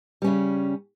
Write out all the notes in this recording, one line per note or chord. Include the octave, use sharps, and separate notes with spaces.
C#3 G3 C#4